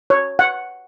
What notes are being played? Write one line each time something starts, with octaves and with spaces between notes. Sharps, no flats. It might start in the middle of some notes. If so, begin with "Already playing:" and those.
C#5
F#5